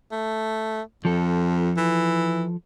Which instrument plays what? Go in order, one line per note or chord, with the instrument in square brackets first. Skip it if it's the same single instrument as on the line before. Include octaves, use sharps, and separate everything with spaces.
[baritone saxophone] A3
[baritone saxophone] F2 [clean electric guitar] F3 A4
[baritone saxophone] E3